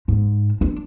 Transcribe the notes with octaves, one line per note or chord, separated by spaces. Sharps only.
G#2
D4